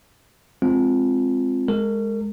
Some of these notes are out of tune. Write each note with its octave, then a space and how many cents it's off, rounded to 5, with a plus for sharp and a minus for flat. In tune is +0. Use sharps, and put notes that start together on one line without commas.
G#3 +0 C4 +0 F4 +0
G#3 +0 A#4 -30